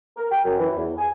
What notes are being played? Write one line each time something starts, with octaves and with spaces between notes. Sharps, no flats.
A#4
G5
F#2
E3
E2
G#5